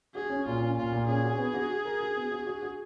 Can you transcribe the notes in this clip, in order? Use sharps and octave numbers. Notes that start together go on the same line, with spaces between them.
F#4 G#4
C#4
A#2 F4
C#4
A#2 F4
A#2
C#4 G#4
F#4
B3
F#4
F#4
A#4
F#4
B3
F#4
F#4
F#4